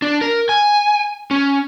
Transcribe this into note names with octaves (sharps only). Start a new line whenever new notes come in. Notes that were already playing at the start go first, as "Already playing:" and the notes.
D4
A#4
G#5
C#4